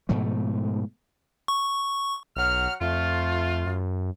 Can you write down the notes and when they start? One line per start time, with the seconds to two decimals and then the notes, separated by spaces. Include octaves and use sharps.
0.09 G#2 B2 F3 A3
1.48 C#6
2.36 B1 F#3 F#5 F6
2.81 F2 A3 F4
3.66 F#2